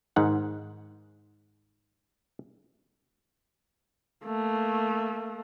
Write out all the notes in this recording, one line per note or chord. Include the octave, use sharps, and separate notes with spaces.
G#2 D#3 F#5
A3 A#3